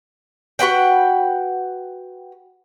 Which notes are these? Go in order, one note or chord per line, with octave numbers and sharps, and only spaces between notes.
F#4 B4 F#5 G5